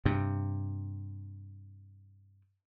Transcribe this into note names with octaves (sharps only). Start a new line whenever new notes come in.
G2 C3